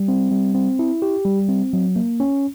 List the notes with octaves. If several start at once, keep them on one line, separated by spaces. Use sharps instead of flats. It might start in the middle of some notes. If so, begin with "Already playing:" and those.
Already playing: G3
C4
G3
C4
E4
G4
G3
C4
F#3
A#3
C#4